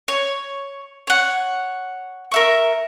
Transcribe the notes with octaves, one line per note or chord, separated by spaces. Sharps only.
C#5
C#5 F#5
A#4 E5 C#6